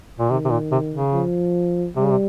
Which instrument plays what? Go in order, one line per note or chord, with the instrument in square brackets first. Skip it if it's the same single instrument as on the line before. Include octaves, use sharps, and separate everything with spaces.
[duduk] A#2
[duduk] C3 [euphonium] D#3
[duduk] C3
A#2
C3
C#3
[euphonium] F3
[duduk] C3 [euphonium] G3
[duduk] C#3
C3